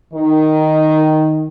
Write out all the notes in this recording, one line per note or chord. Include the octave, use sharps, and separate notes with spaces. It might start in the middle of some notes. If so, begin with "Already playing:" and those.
D#3